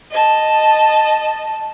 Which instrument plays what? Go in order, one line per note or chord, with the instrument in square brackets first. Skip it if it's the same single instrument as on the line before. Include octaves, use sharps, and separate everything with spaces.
[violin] D#5 A5